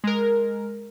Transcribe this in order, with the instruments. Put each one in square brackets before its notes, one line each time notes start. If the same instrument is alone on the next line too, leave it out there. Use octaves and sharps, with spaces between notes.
[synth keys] G#3 A#4